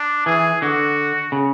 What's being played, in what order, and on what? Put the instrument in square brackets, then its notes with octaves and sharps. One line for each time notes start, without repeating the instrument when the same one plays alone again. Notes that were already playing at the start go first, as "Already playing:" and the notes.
Already playing: [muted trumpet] D4
[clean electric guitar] E3 [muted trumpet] G#4
[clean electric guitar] D3 [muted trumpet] F#4
[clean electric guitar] C#3